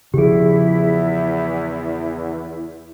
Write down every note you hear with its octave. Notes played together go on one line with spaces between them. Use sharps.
E2 C#3 F3 E4 G4 G#4